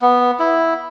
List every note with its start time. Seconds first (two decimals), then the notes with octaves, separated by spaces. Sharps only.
0.02 B3
0.40 E4